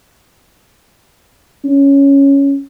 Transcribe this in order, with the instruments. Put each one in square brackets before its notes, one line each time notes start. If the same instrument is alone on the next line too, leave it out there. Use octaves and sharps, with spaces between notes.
[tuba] C#4